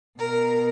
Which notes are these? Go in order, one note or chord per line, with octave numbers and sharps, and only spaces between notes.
B2 A#4